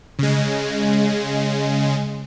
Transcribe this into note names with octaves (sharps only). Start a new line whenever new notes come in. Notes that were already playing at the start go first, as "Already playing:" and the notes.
C#3 G#3